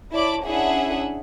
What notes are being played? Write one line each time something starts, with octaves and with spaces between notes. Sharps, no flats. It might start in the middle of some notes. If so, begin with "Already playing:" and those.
E4 C#5 D5 A5 B5 D6
C#4 D4 E4 G#4 E5 F#5